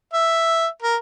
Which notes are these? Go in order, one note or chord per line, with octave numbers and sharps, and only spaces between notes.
E5
A#4